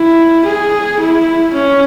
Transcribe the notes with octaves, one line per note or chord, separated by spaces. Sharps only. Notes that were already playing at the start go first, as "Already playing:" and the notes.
Already playing: E4
G#4
E4
C#4